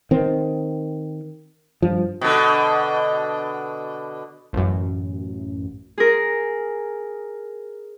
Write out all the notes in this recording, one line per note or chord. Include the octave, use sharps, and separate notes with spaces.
D#3 C4
G2 F3
B2 D3
A1 F#2
G#4 A#4